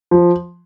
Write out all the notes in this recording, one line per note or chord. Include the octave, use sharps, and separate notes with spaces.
F3